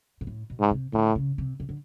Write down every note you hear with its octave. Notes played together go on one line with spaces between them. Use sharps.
A#2
A2
B2
G#2
C3
A2 D3
C#3
C3
C3
D3